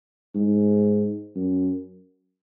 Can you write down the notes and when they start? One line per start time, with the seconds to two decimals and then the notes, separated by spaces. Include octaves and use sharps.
0.35 G#2
1.36 F#2